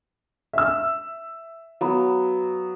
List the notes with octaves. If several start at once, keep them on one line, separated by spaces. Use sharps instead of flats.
E5 E6
F#3 B3